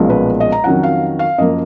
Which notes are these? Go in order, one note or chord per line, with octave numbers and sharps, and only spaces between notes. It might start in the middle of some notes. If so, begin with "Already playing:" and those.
Already playing: B1 A#2 F3 G#3 C#4
B4
D#5
A#5
F2 D#3 F#3 C#4 F#5
F5
F5
F#2 F3 A#3 D#5